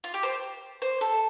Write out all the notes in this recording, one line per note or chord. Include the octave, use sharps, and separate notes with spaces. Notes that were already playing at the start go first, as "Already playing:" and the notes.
F4
G4
C5
C5
A4